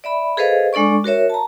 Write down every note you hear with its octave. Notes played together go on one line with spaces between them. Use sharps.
D5 E5 B5
G#4 A4 B4 C5 D#5 F5
G#3 D4 A4 D5 C#6
F#4 A#4 C#5 E5
A5 A#5